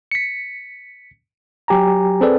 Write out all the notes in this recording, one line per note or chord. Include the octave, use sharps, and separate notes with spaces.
B6 C#7
F#3 G4 G#5 A#5
C4 G#4 A4 B4 D5